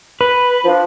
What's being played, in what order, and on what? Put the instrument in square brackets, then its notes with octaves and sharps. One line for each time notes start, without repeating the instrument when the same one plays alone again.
[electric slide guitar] B4
[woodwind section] F3 D4